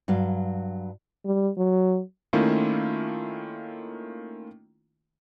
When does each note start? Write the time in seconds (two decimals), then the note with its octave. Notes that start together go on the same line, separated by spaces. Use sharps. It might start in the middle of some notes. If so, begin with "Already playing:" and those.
0.08 G2 F#3 F5
1.26 G3
1.58 F#3
2.33 D#3 A3 A#3 C#4 E4 F4